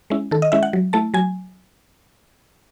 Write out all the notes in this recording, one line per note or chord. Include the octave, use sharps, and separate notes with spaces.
G#3 C#4 E4
D#3 A4
D#5
G#3 C#4 E4 E5
F#5
F#3
A3 E4 A5
F#3 G#5